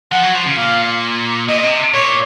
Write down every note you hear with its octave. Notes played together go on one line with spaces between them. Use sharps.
F3 F#5
F#3
F3
C#3
A#2 F5
A#2 D#5
C3
A#2 C#5